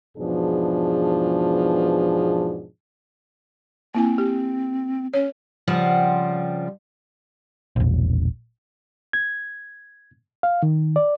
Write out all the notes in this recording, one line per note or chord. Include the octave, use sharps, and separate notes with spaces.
E2 G#2 B2 F3 D4 G#4
A#3 C4 E4 G#5
G4
C#4 C#5
C#3 F3 G3 C4 F#5
E1 A#1
G#6
F5
D#3
D5